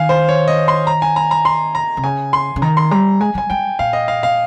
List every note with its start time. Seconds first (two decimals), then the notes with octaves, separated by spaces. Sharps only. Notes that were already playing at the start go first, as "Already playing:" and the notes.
Already playing: D#3 F5 G#5
0.09 C5
0.29 C#5
0.48 D#5
0.68 C6
0.87 A#5
1.02 G#5
1.16 A#5
1.31 A#5
1.45 C6
1.75 A#5
1.97 C3
2.03 C#3 G#5
2.33 C6
2.56 C#3
2.62 D#3 A#5
2.77 C6
2.91 G3 A#5
3.20 G#3 G#5
3.35 G3 G#5
3.50 G3 G5
3.79 A#2 F5
3.93 D#5
4.08 F5
4.23 F5